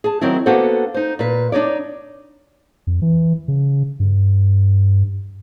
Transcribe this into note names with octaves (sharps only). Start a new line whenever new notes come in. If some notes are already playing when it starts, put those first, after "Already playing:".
G#4 A5
D#3 F#3 C4 E4
A#3 B3 D4 F#4 A4 C5
D#4 C5
A#2 B4
D4 D#4 C#5 D5
F2
E3
C#3
G2